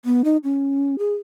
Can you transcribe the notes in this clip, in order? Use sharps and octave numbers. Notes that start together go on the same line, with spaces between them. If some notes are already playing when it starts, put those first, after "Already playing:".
B3
D#4
C#4
G#4